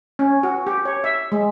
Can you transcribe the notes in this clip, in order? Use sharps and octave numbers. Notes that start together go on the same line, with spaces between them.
C#4
F#4
G4
C#5
E5
G#3